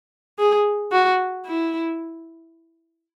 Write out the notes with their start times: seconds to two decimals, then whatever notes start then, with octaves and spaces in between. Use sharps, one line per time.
0.39 G#4
0.92 F#4
1.46 E4